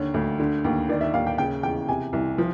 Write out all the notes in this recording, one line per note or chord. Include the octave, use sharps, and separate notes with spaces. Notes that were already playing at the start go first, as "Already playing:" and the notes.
Already playing: D#2 D3 C#5
D2
D3
D#2
D#3 D5
E5
D#2 F5
G5
C#3 G5
E2 G5
C3 G#5
C2
F3